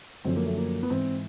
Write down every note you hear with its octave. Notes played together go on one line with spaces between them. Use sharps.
F#2 D3 F3 C4
A#3
A3
A#3
B3
G#2 E3 C4